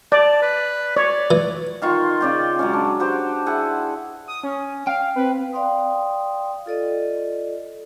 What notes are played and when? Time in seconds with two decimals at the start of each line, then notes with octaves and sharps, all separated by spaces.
0.12 D5 A5
0.42 B4
0.96 C#5 D5
1.31 E3
1.82 D#3 F4 C6 C#6
2.21 C#3 D5 G5
2.59 F#3 G#3 C#4
2.73 D4
3.00 G4 B4 C5 F#5
3.46 E4 G#4 F#5
4.28 D#6
4.43 C#4
4.87 F5 G5
5.16 C4 B4
5.53 D5 F5 G5 C6 D#6
6.66 F4 A4 D5 D#5